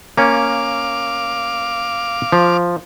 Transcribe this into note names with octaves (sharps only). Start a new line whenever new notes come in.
A#3 C#4 F5 D6
F3